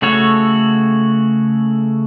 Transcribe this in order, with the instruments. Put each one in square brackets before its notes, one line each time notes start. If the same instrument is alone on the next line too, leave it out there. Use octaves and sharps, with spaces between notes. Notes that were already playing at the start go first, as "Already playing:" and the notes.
[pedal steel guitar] C#3 A3 F#4 A4 C#5